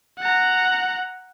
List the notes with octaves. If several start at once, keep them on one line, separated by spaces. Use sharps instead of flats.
F#5 A#5